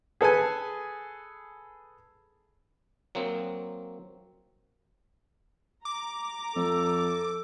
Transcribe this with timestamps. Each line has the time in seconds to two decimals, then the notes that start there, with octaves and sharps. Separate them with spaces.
0.21 G#4 A4 B4 G#5
3.15 F#3 A#3 C4
5.85 A#5 D6
6.56 F2 A4